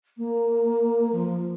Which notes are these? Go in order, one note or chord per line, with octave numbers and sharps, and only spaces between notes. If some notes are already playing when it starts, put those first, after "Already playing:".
A#3
F3